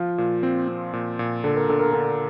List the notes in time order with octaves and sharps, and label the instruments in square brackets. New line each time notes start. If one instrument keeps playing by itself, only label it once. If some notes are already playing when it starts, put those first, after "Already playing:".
Already playing: [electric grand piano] F3 [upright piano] F4
[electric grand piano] A#2
C4
C4
A#2
A#2
[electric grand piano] D3 [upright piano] A4
[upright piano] A#4
[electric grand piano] D3 [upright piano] A4
[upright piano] A#4
[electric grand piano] D3 [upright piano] A4